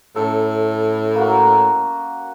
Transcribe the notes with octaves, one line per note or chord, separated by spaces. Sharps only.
A2 C#4 A4
A#3 F#4